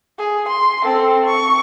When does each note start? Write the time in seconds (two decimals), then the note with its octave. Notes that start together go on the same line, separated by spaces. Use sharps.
0.18 G#4
0.49 C6
0.84 C4 A4
1.26 C#6